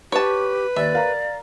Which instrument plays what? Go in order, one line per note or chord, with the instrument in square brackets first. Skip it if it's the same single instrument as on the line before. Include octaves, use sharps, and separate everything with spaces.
[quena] G4 [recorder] B4 [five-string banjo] C#5 A5
[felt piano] D#2 [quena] D5 [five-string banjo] E5
[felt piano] A#4 F5 A#5